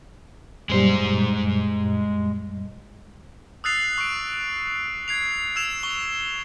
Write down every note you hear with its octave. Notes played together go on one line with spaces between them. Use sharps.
F#2 A#2 G3 G#3 C5
D#6 E6 F#6 A6 C7 F7
C#6 D7
G#6 C7 F7
E6 G#6 E7 F7
C#6 G7